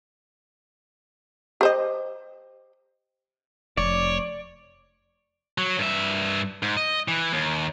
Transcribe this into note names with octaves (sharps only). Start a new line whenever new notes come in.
G4 C5 D#5
F1 C#5 D5
F#3
G2 E5
G#2
D#5
E3
D#2